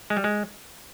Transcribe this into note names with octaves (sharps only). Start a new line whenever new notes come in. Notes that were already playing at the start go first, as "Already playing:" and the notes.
G#3
G3
G#3